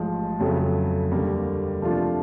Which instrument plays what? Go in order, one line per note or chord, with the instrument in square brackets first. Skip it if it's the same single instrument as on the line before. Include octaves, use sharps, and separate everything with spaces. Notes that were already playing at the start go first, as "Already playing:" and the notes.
Already playing: [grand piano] A1 G#2 F3 G#3
F2 C#3 F#3 A3
D#2 D3 G3 A#3
C3 F3 A3 D4 F4